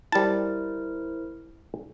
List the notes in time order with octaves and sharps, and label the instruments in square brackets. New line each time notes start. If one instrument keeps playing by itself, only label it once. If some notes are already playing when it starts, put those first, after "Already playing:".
[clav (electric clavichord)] G3 A5 [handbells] E4 A#4 C5